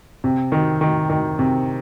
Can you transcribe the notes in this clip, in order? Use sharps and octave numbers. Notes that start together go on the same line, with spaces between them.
C3
D#3
D#3
D#3
C3